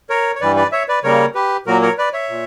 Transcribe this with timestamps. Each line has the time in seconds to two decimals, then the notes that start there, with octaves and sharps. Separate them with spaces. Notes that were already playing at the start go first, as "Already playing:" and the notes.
0.10 A#4 C#5
0.36 C#5
0.41 G2 E3 G3 B4 D5
0.56 B4 D5
0.72 C#5 E5
0.88 B4 D5
1.04 C#3 G3 A#3 A#4 C#5
1.35 G4 B4
1.66 A#2 F#3 A#3 F#4 A#4
1.82 A#4 C#5
1.98 B4 D5
2.13 C#5 E5
2.29 A#2